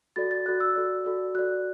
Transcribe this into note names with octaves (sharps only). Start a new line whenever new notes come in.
F#4 A4 D5 A6
A6
F#4 A4 D5 F#6
E6
F#4 A4 D5
F#4 A4 D5
F#4 D5 F#6